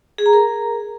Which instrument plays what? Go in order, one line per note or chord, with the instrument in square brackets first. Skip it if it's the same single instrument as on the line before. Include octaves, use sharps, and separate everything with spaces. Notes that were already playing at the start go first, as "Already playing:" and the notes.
[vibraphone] G#4
A#5
A#4